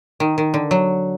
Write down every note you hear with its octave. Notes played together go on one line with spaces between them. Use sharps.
D#3
D#3
D3
F#3